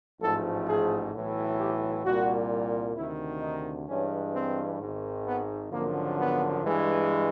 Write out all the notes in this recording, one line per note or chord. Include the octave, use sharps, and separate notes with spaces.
A1 G#2 F3 A3 A4
G#4
B1 A2 E3
G4
C2 A#2 G3 F#4
D2 C3 D#3 E4
D#4
G2 E3 G#3 C#4
C4
G#1 G#2 D#3
B3
G#1 F#2 D3 F3 A#3
B3
G2 E3 G#3